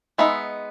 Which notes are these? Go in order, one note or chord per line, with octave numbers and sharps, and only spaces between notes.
G#3 B3 D#4 E5